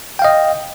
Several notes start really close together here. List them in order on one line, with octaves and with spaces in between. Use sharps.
G5 F5 D#5